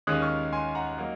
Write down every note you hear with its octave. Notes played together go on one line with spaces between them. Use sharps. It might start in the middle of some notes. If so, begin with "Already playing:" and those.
D#2 D#3 G#3 C#4 D#6 F#6
C#6 F6
G#5 C6
F#5 A#5
F#3 A#3 D#4